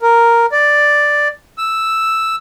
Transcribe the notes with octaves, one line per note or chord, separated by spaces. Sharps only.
A#4
D5
E6